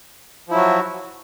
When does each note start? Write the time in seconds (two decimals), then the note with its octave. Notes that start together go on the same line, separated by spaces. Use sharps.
0.48 F3
0.51 E4
0.54 F#3
0.57 F#4